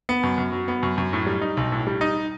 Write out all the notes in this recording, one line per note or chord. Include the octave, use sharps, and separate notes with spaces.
B3
F#2
F#2
F#3
B3
F#2
F#2
A2
G3
D#4
B1
A2
G3
D#4